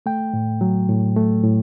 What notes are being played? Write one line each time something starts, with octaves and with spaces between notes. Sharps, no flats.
A3 G5
A2
F#3
A2
A3
A2